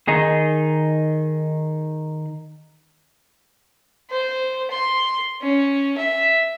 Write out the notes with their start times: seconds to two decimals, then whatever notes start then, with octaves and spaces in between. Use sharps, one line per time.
0.08 D#3 D#4 G#4
4.10 C5
4.70 C6
5.41 C#4
5.97 E5